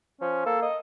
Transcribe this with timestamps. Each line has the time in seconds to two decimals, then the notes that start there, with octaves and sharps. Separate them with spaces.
0.21 F3 C#4
0.46 A#3 A4
0.62 D#5